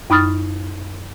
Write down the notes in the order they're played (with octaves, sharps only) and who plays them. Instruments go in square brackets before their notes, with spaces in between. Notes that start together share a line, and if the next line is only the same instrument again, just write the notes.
[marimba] F#2 D#4 B5 D#6 F6 A6